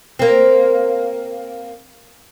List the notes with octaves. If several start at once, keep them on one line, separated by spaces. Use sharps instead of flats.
A#3 C4